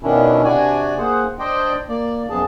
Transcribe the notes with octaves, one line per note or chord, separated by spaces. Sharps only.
B2 D#3 C#4 D4 E4
C3 D4 F#4 D5 G#5
A#3 G#4 C5 F#5
D4 C5 D5 D#5 G5
A#3 D5
F#2 F3 B3 G#4 A5